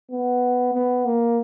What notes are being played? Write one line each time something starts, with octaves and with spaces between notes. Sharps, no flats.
B3
B3
A#3